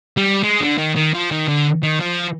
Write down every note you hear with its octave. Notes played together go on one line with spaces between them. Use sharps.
G3
G#3
D3
D#3
D#3
F3
D#3
D3
D#3
F3